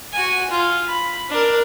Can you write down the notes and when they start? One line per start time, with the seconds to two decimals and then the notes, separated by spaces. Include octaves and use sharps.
0.13 F#4 G#5
0.50 F4
0.88 B5
1.30 D4 A#4